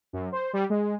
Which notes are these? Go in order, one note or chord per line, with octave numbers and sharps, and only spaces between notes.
F#2
C5
G3
G#3